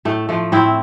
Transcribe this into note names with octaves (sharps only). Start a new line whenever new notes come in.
A2 A3
F3 A3
A2 C4 E4